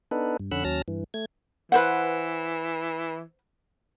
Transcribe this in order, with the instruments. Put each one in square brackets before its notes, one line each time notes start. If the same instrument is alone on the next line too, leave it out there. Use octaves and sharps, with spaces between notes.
[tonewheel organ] B3 D4 D#4 A4 B4
G2
F2 D3 C#4 F#5 B5 E6
D#2 F#3 C#4 A5 F6 A#6
G2 E3
A3 G#6
[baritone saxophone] E3 [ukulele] B4 C5 F#5